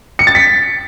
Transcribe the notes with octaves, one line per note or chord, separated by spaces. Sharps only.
C#7
A6
B6